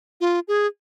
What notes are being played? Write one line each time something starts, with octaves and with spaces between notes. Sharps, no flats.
F4
G#4